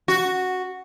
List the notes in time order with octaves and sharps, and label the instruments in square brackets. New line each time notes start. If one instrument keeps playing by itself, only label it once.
[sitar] F#4